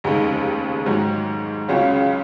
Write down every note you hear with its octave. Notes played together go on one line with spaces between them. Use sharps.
F1 D#2 C#3 G#3 D#4
G#2 D#3 F#3
C#2 C#3 F#3 C#4 F4